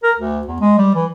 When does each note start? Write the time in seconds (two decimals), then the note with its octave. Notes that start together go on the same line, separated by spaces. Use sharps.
0.03 A#4
0.17 D2
0.47 E2
0.61 G#3
0.78 G3
0.95 E3